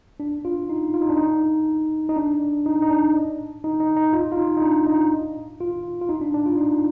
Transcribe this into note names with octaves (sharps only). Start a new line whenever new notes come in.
D4
F4
D#4
F4
D#4
D4
D#4
D#4
D4
D#4
D#4
D4
D#4
D#4
D#4
F4
F4
D#4
D#4
D4
D#4
F4
F4
D#4
D4
D4
F4
D#4